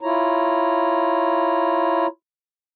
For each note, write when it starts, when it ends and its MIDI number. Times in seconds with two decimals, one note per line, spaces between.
0.01 2.07 64
0.01 2.07 65
0.01 2.07 73
0.01 2.07 82